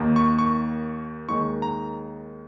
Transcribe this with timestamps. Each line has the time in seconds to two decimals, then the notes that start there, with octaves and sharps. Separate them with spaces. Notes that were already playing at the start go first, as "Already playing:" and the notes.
Already playing: D#2 D#3 A#3
0.16 C#6
0.39 C#6
1.29 D#2 D#3 G#3 C#6
1.62 A#5